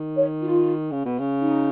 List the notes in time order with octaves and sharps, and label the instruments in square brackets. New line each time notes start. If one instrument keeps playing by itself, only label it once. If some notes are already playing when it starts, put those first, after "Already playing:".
Already playing: [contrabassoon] D#3
[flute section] C#5
F4
[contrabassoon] C#3
B2
C#3
[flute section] D#4